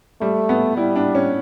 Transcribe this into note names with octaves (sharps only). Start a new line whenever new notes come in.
G3 A3
B3
G3 E4
D4
C#4